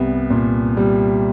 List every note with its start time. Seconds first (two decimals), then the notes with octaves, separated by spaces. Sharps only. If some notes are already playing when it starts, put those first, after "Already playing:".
Already playing: C2 G3 B3
0.30 A#2
0.77 G3